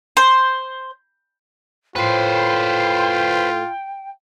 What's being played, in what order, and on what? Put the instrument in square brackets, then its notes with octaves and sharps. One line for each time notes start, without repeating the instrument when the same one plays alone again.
[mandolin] C5
[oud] A2 C4 [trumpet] F4 [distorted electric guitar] B4 C5 [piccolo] G5